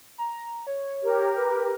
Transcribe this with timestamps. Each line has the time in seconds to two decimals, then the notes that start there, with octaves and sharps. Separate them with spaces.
0.18 A#5
0.67 C#5
1.02 G4 A#4
1.38 B4